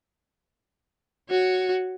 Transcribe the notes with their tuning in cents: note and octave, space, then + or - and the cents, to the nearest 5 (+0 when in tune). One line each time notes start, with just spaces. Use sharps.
F#4 +0 C#5 +0